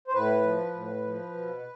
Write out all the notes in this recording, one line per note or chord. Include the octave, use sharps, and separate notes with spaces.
C5
A2 B4
F3
A2
F3
B2